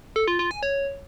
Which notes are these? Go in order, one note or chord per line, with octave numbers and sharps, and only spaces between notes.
A4
F4
F4
G#5
C#5